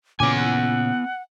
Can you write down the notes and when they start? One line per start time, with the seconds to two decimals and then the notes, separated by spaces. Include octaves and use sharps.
0.20 A#2 C#3 B3 C#4 G#5 D6
0.35 F#5